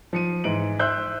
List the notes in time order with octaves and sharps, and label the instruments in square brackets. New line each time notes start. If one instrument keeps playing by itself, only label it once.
[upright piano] F3 C#7 D#7
G#2 E3 D7 F#7
C5 E5 E6 F#6 G6